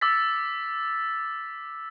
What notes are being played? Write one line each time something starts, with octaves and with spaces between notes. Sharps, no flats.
D6 E6 A6 B6